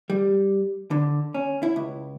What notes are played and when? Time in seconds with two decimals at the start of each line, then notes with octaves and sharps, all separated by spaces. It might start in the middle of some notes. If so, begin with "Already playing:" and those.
0.10 G3
0.91 D3
1.34 C#4
1.63 E4
1.76 C#2